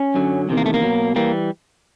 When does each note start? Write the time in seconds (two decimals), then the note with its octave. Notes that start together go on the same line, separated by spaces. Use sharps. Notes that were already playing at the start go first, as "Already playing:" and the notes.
Already playing: C#4
0.15 F#2 D3 F#3
0.49 E2 C3 D#3
0.57 A#3
0.66 A3
0.74 A#3
0.82 B2 F#3
1.16 E3 G3 A#3